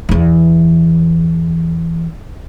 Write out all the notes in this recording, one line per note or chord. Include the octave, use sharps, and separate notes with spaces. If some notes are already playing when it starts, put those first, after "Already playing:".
E2 E3